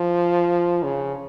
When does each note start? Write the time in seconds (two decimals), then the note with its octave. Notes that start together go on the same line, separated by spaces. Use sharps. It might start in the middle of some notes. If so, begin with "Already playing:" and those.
Already playing: F3
0.83 C#3